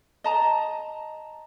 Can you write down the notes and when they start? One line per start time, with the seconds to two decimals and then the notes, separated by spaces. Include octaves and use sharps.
0.24 D#5 A5 A#5